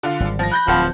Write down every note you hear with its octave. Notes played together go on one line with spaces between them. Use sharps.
D3 F4
G#1 G3
F3 A#6
B5 F#6 G6 A#6
D1 F3 C4 F#5 A5